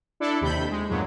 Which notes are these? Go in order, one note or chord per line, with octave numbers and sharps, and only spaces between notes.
D4 E4 A4 D5
D#2 C3 B5 G6
G#3
E2 G2 A#2 F#3 G#3